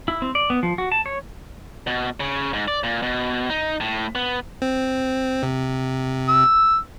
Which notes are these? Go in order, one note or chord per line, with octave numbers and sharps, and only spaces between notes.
E4
C4
D5
B3
F3
F#4
A5
C#5
B2
C#3
G#2
D5
A#2
B2
D#4
A2
B3
C4
C3
E6